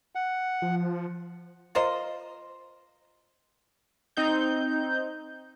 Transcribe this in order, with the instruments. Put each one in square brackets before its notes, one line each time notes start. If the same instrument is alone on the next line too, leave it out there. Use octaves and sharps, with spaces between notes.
[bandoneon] F#5
[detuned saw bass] F3
[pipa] F4 A#4 C5 D#5
[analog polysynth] C4 D#4 G6